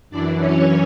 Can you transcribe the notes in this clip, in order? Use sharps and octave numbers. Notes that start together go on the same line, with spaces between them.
F#2 E3 D4 D5
C#4 C#5